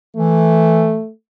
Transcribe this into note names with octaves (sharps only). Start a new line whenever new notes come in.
E3 A3